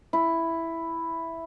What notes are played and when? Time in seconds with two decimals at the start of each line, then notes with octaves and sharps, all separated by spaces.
0.13 E4